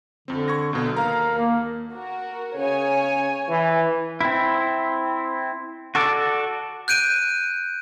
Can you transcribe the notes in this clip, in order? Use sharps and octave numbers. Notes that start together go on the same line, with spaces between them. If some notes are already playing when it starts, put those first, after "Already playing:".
F2 D3 C4
C#6 G#6 A#6
B1 B2 D3
D#2 A#4 F5 A#5
A#3
F#4 A#4
C#3 C#5 G#5
E3
C4 E4
F#4 A4 D5
F#6 G6 D7 D#7